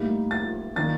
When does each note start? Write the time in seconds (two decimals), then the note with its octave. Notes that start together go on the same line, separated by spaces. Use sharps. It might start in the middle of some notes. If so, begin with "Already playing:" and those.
Already playing: A2 G3 A#3 D#4
0.31 A6
0.76 D#3 A#3 D4 A6